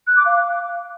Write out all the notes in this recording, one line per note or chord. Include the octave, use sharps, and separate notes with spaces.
F#6
D6
F5